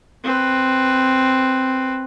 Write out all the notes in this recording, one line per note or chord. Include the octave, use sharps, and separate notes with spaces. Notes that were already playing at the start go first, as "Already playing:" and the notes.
C4 B4